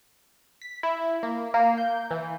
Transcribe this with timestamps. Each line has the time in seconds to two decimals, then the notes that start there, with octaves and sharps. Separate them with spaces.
0.62 B6
0.83 E4
1.23 A#3
1.54 A#3
1.78 G6
2.11 E3